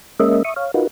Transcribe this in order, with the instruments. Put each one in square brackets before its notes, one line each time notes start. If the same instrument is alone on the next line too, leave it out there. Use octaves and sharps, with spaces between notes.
[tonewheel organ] G#3 A#3 C#4 A#4 D#5 E5
E5 C#6 D#6
C#5 F5
D#4 F4 F#4 A#4 B4